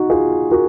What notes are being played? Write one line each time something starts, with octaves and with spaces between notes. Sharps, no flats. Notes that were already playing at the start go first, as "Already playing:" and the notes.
Already playing: D#4 F#4
F4 G#4
F#4 A#4